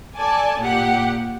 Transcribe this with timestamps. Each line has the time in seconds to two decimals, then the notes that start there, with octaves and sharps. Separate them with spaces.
0.17 A4 D5 G#5 A5
0.60 A#2 G4 F#5